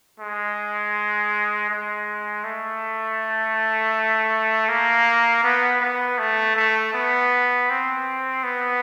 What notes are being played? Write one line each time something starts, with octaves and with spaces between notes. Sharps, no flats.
G#3
G#3
A3
A#3
B3
B3
A3
A3
B3
C4
B3